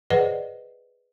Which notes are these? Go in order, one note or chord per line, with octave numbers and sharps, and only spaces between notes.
G#4 B4 C5 D5 D#5 F#5